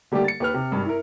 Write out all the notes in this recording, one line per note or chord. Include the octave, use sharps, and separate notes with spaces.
D3 G3 A3 A#3 G4
A6 C#7
D#2 B4 F6
C3
G#1 G2
E4 A#4